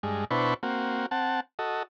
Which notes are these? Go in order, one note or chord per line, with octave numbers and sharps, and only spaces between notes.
G2 G#3
B2 D4 E4 B4 C5 C#6
A#3 C4 F#4
C4 F#5 A5
F#4 A4 D#5